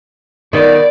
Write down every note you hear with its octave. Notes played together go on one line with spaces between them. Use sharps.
D#3 B3 D5